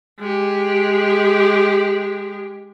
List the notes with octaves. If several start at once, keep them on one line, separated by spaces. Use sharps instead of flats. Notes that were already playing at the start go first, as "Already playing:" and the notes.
G#3 G4